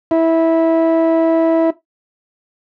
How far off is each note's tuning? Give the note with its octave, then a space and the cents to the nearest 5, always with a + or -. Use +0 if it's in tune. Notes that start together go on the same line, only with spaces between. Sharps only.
E4 -15